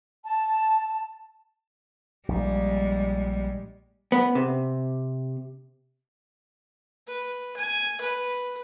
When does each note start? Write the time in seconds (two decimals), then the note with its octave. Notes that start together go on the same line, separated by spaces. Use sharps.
0.25 A5
2.29 A#1 G3 G#3
4.12 B3
4.35 C3
7.07 B4
7.57 G#5
8.01 B4